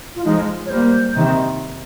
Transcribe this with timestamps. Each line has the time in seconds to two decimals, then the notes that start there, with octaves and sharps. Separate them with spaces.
0.15 F4
0.24 F3 G#3 D#4
0.66 C#5
0.69 G3 A#3 C5
1.15 C3 D#3